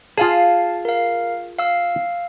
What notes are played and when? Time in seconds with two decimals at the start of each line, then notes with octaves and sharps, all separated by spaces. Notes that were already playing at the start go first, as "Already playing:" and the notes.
0.18 F4 G#4 F5 A5
0.85 A#4 F5
1.59 F5 E6